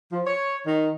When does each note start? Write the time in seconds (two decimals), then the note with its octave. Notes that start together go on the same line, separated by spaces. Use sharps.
0.11 F3
0.26 C#5
0.66 D#3